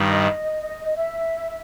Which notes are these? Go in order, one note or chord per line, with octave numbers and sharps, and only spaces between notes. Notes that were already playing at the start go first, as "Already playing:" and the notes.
Already playing: G2 D#3 G3
D#5
E5